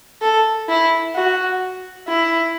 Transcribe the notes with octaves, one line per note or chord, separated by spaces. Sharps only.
A4
E4
F#4
E4